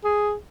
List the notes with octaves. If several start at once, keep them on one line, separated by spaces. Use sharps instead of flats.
G#4